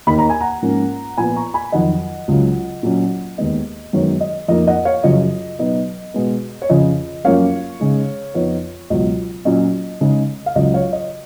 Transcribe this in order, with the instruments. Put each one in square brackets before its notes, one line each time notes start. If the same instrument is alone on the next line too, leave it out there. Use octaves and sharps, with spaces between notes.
[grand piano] D#2 D#3 A#3 D#4 B5
A#5
G#5
F#5 A#5
G#2 F3 A#3 C#4
A#2 F3 B3 G#5 B5
A#5 C#6
G#5 B5
F2 D#3 F#3 D#5 F#5
C#2 C#3 F#3
A#2 F#3 C#4
D#2 D#3 G#3 B3 D#5
F#2 D#3 G#3 B3 C#5
D#5
F2 F3 A#3 D#4 D#5
D#5 F#5
C#5 F5
F#2 C#3 F3 D#5
B2 F#3 B3 D#4 D#5
B2 G#3 B3
C#5
F2 C#3 F3 D#5
F#2 F3 A#3 C#4 C#5 F5
C#3 G#3 D#4
F2 F3 B3 D#4 C#5
C#2 B2 F#3 D#5
A#2 F#3 C#4 D#5
C#3 G#3 D#4
F5
C#2 C#3 F#3 D#5
C#5 F5
D#5